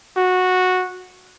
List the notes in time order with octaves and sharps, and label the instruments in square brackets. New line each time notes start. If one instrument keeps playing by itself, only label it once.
[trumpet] F#4